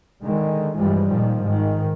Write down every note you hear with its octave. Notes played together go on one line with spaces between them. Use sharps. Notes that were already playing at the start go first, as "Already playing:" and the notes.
D3 D#3 G#3
G2 E3 F3 G3 G#3
A#2 D#3 F3
G#2 D#3